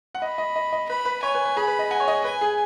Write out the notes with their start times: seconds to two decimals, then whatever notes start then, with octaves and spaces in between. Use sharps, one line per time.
0.15 F#5
0.22 D#5 B5
0.38 D#5
0.56 D#5
0.72 D#5
0.89 B4 B5
1.05 B4
1.23 C#5 G#5
1.34 B4
1.45 B4
1.57 G#4 B5
1.67 B4
1.79 D#5
1.91 F#5 G#5
2.00 C#5
2.08 D#5
2.24 B4 G#5
2.41 G#4